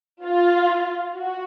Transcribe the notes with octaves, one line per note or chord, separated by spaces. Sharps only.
F4
F#4